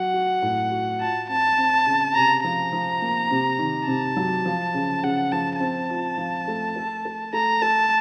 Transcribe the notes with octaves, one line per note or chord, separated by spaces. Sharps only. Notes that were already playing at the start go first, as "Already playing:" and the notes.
Already playing: F#3 F#4 F#5
F#4
A2
F#4
F4 A5
C4 A5
C4
C#3
C3 A#5
F3 A#5
F3
A#3
C3
D#3
C3 A5
F#3
F3
C#3
C#3 F#5
F3 A5
C4 A5
F4
F3
A3
A4
A4
A3 A#5
A4 A5